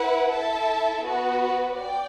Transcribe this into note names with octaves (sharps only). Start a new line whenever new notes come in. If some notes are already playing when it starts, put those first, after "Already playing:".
Already playing: E4 B4 F#5
E4 A4 E5 A5
B3 F#4 B4
D5 G5